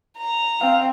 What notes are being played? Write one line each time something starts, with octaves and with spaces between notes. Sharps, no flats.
A#5
C4 F5